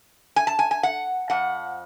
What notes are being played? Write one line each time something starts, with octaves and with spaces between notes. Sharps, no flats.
G#5
A5
G#5
G#5
F#5
F2 F3 F#5